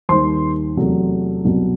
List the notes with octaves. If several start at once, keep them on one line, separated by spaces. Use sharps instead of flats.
D#2 D#3 G3 C5 C6
E2 C3 F#3 A3
C2 B2 F#3